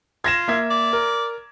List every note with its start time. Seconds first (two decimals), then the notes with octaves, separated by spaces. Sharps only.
0.24 F4 G#6 A#6 E7
0.48 A#3 E5 G#6
0.70 D5
0.93 A#4